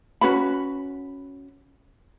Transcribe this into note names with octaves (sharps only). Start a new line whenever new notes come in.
C#4 F#4 B4 B5